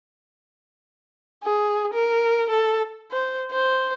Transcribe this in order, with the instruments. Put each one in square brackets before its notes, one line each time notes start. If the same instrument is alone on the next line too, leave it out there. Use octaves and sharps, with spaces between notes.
[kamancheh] G#4
A#4
A4
C5
C5